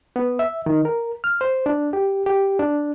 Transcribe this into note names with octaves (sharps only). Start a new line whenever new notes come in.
B3
E5
D#3
A#4
F6
C5
D4
G4
G4
D4